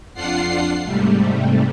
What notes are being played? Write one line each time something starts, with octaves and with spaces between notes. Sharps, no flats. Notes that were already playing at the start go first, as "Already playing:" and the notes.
F2 D4 F4 F#5 C7
G#2 C3 G3 A3